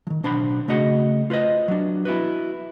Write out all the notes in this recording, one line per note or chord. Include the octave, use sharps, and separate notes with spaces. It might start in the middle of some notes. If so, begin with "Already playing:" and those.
D#3 F3
B1 D4 C5 F#5 B5
C#3 A3 F#4 D#5 F#5
F4 B4 C5 D#5
F#3 D4
B3 E4 F#4 B4